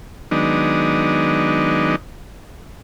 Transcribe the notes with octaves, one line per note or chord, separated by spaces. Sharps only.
D#3 F#3 G#3 B3 D4 D#4